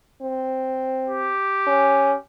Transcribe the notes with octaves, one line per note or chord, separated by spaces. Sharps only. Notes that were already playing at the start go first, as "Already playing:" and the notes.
C4
G4
C#4